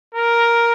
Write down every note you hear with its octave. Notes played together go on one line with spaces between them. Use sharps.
A#4